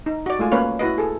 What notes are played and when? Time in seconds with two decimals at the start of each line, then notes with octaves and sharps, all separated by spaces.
0.06 D#4
0.26 F#4 D5
0.39 G#3 A3 F4 G#5
0.51 A#3 C#4 B4 C#5 F5
0.79 E4 F#4 B4 D#5
0.98 G#4 A4